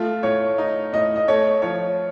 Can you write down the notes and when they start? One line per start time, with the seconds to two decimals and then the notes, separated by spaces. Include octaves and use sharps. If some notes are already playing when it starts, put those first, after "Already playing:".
Already playing: A3 F4
0.23 A2 C#5
0.58 D#4
0.93 A2 D#5
1.16 D#5
1.28 A3 C#5
1.62 F3 C#5